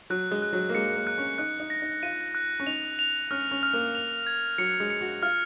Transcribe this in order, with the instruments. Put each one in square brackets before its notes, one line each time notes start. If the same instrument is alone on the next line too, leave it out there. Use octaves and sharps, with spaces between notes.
[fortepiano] F#3 [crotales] F#6
[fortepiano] G#3
[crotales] F#6
[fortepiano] F#3
A#3
[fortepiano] G#3 [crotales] C#7
[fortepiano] A#3
[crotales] F#6
[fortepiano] C#4
[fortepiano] D#4 [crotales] F#6
[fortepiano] D#4
[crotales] A#6
[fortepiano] D#4
[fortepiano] F4 [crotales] D#7
[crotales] F#6
[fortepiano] C#4
[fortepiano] D#4 [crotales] F7
[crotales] F7
[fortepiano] C#4 [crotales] F6
[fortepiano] C#4
[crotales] F6
[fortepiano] A#3
[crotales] F7
G#6
[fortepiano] F#3 [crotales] C#7
[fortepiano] G#3
[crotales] C#7
[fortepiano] F#4
[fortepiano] F4 [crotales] F6